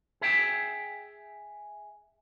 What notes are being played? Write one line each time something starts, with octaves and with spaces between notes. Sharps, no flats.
G#4 E5 G5